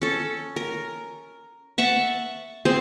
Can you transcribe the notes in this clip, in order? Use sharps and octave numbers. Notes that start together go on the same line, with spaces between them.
C#4 A4
A#4
E5 F#5 A5 C#6
C4 G#4 C5